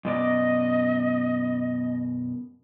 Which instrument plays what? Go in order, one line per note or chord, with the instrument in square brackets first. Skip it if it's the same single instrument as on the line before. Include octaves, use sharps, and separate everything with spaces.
[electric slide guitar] F#2 B2 D5 [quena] D#5